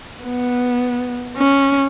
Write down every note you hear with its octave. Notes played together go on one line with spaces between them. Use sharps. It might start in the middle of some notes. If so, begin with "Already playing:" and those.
B3
C#4